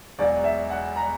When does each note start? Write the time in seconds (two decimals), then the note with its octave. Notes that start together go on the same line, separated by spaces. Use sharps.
0.18 E1 E2 B2 F#3 D5
0.44 E5
0.70 F#5
0.96 A#5